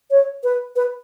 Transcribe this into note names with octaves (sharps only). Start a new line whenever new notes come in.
C#5
B4
B4